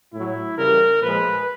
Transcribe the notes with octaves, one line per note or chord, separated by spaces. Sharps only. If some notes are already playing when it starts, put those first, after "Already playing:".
A2 F#3 E4
C#3 E3 G3 A#4
A#2 F3 G#3 B4